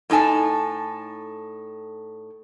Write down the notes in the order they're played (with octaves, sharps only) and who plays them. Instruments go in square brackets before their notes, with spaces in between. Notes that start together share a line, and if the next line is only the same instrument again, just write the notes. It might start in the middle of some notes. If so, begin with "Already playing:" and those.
[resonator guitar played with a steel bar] A2 D#4 A4 G#5 A5